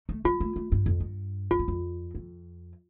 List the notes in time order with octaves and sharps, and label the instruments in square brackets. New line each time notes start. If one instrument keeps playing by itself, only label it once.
[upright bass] A3
[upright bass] G3 [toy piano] F4
[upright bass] A3
A3
G2
F2
G2
[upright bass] F2 [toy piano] F4
[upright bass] G2
F2
F2